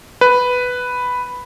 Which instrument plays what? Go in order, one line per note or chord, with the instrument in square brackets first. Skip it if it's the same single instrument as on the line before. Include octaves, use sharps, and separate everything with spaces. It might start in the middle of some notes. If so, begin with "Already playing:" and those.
[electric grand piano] B4